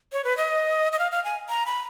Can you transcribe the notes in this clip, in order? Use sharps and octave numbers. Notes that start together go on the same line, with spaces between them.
C#5
B4
D#5
D#5
F5
F5
G#5
A#5
B5